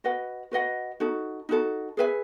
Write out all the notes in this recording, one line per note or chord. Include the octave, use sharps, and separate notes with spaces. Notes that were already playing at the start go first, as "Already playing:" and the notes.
F#4 B4 D#5 F#5
F#4 B4 D#5 F#5
D#4 F#4 A4
D#4 F#4 A4
G#4 B4 E5 G#5